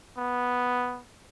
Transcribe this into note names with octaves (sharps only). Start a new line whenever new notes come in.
B3